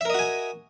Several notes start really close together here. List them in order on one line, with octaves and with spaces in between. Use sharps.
E5 A#4 D#5 F#4 G#5